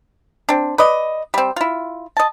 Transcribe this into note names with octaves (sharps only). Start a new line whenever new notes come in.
C4 D4
B4 D5 D#5
G3 C4
E4 F4
D#5 A5